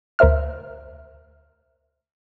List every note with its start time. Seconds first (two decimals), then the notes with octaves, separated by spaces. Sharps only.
0.19 D2 A#4 C5 E5 F6